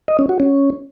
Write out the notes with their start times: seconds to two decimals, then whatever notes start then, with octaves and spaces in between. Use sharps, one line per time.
0.08 D#5
0.19 C#4
0.29 F#4
0.40 C#4